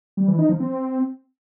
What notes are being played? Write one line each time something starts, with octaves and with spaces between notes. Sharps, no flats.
G3
E3
D#4
F3
C4